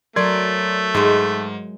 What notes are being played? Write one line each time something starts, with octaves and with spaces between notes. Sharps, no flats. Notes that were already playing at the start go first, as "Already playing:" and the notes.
F#3 A3 A#4 D5 C6 G#6
G#2 G#3 E5